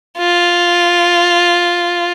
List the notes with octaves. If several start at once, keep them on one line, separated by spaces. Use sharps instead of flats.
F4